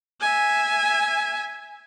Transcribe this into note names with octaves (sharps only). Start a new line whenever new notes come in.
E5 G#5